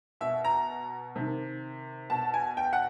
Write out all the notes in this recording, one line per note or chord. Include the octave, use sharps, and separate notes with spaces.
B2 E5
A#5
C3 D#3
B2 A5
G#5
G5
F#5